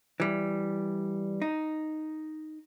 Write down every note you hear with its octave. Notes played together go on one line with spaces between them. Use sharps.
E3 G3
D#4